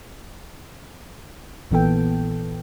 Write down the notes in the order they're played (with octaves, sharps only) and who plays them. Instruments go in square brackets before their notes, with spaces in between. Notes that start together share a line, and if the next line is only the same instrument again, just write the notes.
[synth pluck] A#1 A#2 E3 B3 A4 G5